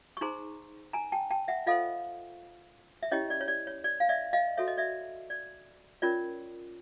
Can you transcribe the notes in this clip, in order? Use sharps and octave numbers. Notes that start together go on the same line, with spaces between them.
C#6
D#4 G#4 C5 A#5 C6
G#5 A#5
G5 A5
G5 A5
E5 F#5
F4 A4 C5 D#5 F5
E5
C#4 E4 G4 C#5 D#5
D5
C#5
D5
C#5
D5
F5
D5 E5
D#5 F5
F#4 A4 C#5 E5
D#5
D5 E5
D5
C#4 F4 A#4 C#5 D5